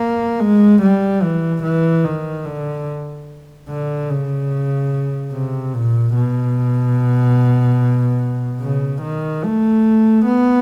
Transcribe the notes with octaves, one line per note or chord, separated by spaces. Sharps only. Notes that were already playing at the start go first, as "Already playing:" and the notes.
Already playing: A#3
G#3
G3
E3
E3
D#3
D3
D3
C#3
C3
A#2
B2
C#3
D#3
A3
B3